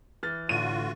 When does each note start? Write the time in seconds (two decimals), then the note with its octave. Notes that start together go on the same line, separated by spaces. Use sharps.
0.23 E3 F6 A6
0.49 A2 D3 F4 F#4 D#7